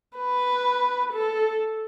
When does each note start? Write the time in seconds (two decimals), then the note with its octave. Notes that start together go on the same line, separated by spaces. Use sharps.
0.18 B4
1.13 A4